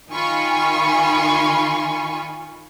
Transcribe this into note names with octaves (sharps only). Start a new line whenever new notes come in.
D#3 F4 G#5 B5 C#6